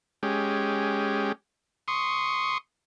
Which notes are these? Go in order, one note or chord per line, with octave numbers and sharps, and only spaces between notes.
G#3 C#4 G4
C6 C#6 D#6